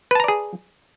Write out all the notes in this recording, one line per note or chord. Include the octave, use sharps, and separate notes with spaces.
G#4 B4 D5 A5 A#5